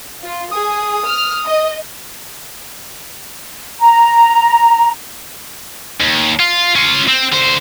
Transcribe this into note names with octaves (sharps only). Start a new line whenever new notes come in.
F4
G#4 D#6
F6
D#5
A#5
D#2
F4
C#4 F4
C4
D3 C5